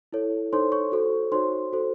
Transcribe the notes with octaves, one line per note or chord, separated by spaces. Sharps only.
E4 A4 C#5
D#4 A4 C5 C#5 C6
C#5 C#6
F#4 A4 C5
D#4 F#4 C5 C#5 C6
F#4 A4 C5